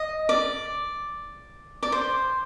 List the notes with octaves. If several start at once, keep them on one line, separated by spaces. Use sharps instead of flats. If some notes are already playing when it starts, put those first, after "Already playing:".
Already playing: D#5
D5
D5
C5